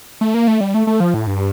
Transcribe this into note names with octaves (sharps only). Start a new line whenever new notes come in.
A3
A#3
A3
G3
A3
A3
F3
A2
G2